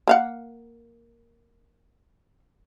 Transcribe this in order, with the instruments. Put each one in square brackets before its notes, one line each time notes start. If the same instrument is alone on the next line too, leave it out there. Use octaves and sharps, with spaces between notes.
[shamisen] A#3 F5 F#5